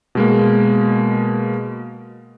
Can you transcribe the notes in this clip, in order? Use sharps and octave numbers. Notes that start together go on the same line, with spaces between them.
B2 G#3 A#3